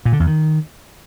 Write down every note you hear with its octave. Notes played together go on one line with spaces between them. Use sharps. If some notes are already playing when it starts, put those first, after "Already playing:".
A#2
D3
E2
D#3